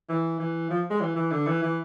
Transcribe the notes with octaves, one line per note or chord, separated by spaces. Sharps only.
E3
E3
F3
G#3
E3
E3
D3
E3
E3